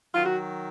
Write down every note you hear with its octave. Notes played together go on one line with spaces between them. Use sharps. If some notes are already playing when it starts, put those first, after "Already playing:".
D#3 F#3 F4
F#4